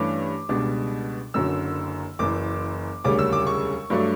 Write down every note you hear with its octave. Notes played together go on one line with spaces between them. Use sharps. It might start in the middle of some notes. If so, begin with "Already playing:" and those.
Already playing: G2 E3 A3 C#4 D6
C#2 B2 G3 D4
F#1 F#2 D3 F#3 E6
F#1 F#2 E3 D6
E1 D2 C#3 G3 C#4 D6
E6
D6
C#6
G2 F#3 A3 D4